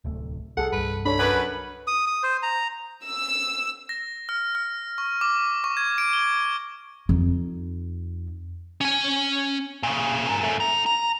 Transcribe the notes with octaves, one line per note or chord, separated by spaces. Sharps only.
D1 C2 A3
C2 G#4 A4 F#5
C2 G2 B4
D4 A4 C#5 B5
F#2 B4
D#6
D#6
C5
A#5
E6
A#6
F6
F6
C#6
D6
C#6
G#6
D7
G7
F2 D#4
C#4 G#5
A#2 C#3
G#4 A#4
F#2 A3
D#4 A#5
A#5